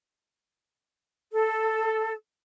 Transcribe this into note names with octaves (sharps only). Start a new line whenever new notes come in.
A4